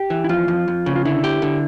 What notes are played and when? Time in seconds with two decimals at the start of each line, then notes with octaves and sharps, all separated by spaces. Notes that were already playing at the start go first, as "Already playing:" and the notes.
Already playing: G4
0.10 E3
0.24 E4
0.29 F2 F4
0.48 F2
0.68 F2
0.86 C#3
0.96 F4
1.05 D3 E4
1.24 G4
1.42 D3